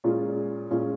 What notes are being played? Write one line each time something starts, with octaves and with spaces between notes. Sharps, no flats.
A#2 G#3 C#4 F4
A#2 G#3 C#4 F4